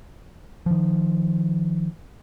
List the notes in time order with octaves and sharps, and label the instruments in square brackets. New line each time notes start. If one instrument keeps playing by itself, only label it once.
[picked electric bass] D#3 F3